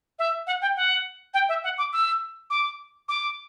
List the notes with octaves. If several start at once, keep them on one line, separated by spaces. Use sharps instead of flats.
E5
F#5
G5
F#5
G5
E5
F#5
D6
E6
D6
D6